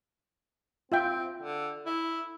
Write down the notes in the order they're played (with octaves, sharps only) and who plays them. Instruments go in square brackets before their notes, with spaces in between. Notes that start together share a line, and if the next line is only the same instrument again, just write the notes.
[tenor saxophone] C4 [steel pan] F4 E5 G5
[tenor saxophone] D3
E4